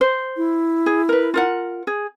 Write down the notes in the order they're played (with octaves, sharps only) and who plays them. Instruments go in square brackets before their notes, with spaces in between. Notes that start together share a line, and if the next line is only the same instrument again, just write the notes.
[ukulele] C5
[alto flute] E4
[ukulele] G#4
A#4 B4
F4 A#4 F#5
G#4